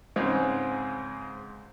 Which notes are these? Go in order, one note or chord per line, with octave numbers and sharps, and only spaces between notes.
C#2 G#2 C#3 G#3 C4